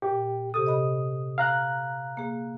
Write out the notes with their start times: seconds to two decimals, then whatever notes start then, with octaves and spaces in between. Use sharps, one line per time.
0.02 A#2 G4
0.54 C3 G4 A4 D#6
0.66 D#5 B5
1.38 F5 A#5 F#6
2.17 A#3 G#4